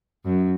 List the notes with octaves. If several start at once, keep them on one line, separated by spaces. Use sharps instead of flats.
F#2